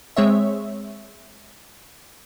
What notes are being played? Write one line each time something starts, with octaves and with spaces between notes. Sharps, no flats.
G#3 C4 C#5 E5